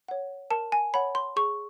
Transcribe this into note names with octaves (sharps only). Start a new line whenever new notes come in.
C#5 F#5
A#4 A5
G#5
C#5 F#5 B5
C6
G#4 C#6